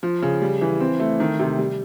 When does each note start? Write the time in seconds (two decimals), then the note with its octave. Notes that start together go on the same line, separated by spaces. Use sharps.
0.03 F3
0.22 C#3
0.42 G3
0.61 E3
0.80 C4
1.00 A3
1.20 D#3
1.39 C3
1.58 G3